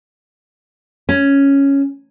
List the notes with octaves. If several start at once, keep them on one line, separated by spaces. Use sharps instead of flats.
C#4